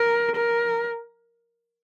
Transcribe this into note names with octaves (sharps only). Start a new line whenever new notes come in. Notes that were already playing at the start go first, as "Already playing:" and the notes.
Already playing: A#4
A#4